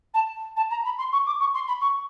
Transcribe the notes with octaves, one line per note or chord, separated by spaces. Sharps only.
A5
A5
A#5
B5
C6
C#6
D6
C#6
C6
B5
C#6